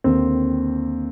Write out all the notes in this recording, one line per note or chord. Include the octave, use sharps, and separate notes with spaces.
D#2 D3 C4